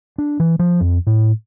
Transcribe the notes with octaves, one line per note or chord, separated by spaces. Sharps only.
D4
E3
F3
F2
A2